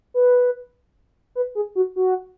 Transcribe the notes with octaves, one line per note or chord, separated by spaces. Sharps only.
B4
B4
G#4
F#4
F#4